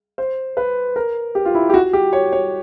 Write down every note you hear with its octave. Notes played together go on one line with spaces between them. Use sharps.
C5
B4
A#4
G4
F4
E4
G4
F#4
G4
C#5
C#5